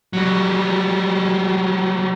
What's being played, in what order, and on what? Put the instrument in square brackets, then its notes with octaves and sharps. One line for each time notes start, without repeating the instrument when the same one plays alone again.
[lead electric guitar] F#3 G3